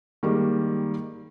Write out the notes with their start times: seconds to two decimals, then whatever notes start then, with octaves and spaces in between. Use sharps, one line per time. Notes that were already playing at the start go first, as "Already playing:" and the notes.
0.23 D#3 G3 G#3 A#3